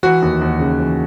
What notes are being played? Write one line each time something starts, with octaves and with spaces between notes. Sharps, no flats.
E3 F#4
D#2
D#2
C#3
E3